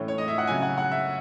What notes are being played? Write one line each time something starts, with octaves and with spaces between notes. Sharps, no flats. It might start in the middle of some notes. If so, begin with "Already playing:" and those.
Already playing: A2 E3 A3 C#4
C#5
D#5
E5
F#5
C#3 F#3 C#4 G#5
F#5
F#5
E5